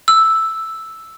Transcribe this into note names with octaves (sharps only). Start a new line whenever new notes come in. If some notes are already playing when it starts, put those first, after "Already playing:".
E6